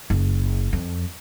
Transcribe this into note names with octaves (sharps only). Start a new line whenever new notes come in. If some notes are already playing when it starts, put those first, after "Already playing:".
F#1
F2